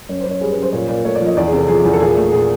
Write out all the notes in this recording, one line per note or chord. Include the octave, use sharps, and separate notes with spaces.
F#2 C#5
C5
F#2
C#5
G3 G#4
F#2 B4
C5
A#2 C#5
A#2 D5
A3 C#5
D5
F3 D#5
E2 D5
G#4
C3
A4
F3 G#4
E2
A4
A#2 G#4
A3
A#2 G#4